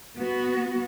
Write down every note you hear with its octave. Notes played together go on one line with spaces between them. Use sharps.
B3 F#4